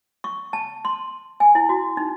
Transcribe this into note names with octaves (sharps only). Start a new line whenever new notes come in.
C#6
A5
C6
G#5
E4
F#4
D#4